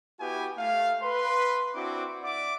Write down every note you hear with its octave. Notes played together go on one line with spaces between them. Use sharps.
B3 E4 F#4 G4 B4 G#5
A3 F5
B4 C6
C4 D4 E4 F#4 D6
D5 E5 F#5 D6